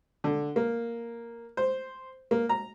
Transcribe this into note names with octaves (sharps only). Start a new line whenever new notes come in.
D3
A#3
C5
A#3
A#5